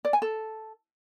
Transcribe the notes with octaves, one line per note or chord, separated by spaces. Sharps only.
D5
G#5
A4